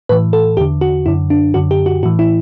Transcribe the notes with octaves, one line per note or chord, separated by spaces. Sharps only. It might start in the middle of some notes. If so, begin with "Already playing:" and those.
A2 E3 B4
A4
E2 D3 G4
F#4
F#2 D3 E4
D4
F#2 D3 F#4
G4
F#4
A2 E3 F#4
E4